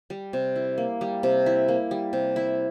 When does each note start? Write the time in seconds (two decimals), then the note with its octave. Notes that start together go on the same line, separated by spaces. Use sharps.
0.10 G3
0.33 C3
0.56 E4
0.78 A#3
1.01 G3
1.23 C3
1.46 E4
1.68 A#3
1.91 G3
2.13 C3
2.36 E4